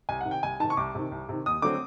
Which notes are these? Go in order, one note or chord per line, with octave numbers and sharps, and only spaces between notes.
C2 G#5
F#5
C3 D#3
G5
C2 G#5
C3 D#3 A5
C#6
C2 D6
C3 D#3
C2
C3 D#3
D#2 D#6
D3 F#3 A3 C4 D6